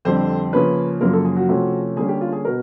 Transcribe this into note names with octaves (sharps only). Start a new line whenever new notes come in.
F2 D3 G3 C4 C5
C#3 F3 A#3 C#4 B4
F#2 C#3 F3 A#3 A#4
A4
G#4
F#4
C3 F3 A3 C#4
D3 G3 A#3 C#4 G#4
G4
F4
G#4
B2 A#4